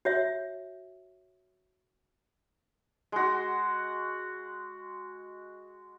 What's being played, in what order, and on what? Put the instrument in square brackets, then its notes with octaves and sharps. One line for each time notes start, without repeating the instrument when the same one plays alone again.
[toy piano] F#4 C#5 E5
[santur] G#3 F#4